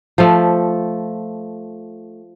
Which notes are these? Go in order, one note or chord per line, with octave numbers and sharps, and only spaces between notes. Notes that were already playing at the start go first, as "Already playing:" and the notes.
F3 A3